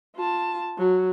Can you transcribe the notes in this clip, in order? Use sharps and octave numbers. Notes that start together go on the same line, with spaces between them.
F4 A5
F#3